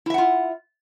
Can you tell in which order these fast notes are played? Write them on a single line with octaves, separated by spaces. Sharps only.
E4 E5 F#5 F4